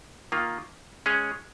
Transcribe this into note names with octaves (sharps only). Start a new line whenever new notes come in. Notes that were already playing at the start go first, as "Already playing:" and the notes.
D#3 A#3 F4
G#3 C#4 G#4 C#5